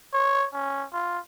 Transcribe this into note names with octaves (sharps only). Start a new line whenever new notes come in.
C#5
C#4
F4